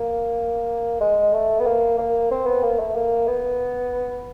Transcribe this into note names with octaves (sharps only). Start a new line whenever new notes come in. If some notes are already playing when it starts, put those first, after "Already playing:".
Already playing: A#3
G#3
A3
B3
A#3
A#3
C4
B3
A#3
A3
A#3
B3